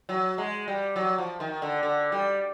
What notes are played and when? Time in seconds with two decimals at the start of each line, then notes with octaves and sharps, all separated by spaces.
0.09 F#3
0.38 G#3
0.68 G3
0.96 F#3
1.18 F3
1.40 D#3
1.62 D3
1.83 D3
2.12 G3